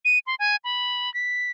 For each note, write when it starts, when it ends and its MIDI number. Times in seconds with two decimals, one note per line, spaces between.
0.05 0.19 99
0.27 0.35 84
0.39 0.56 80
0.64 1.12 83
1.14 1.51 95